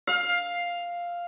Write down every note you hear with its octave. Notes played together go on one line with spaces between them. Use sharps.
F5